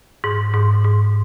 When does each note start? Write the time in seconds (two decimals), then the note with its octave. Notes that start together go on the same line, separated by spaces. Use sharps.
0.24 G#2
0.54 G#2
0.84 G#2